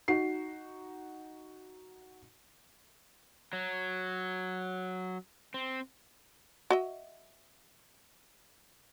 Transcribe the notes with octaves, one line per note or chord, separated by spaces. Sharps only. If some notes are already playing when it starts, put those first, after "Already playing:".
D#4 F#4 C7
F#3
C4
F#4 D#5 E5